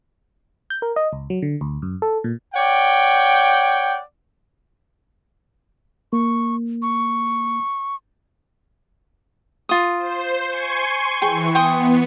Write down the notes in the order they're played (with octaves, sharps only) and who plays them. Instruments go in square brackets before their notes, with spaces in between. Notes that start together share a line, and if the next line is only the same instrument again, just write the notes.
[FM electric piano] G6
A#4
D#5
C#2
F#3
D3
D2
F#2
A4
A#2
[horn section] C#5 D5 F#5 G5
[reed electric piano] A#3 [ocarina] C#6
[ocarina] C#6
[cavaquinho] F4 D#6
[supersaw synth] C5
G#5 C6 C#6
[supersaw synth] E3 C#6 [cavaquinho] G#4 G5
[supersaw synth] B3 [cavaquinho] G5 C6 D#6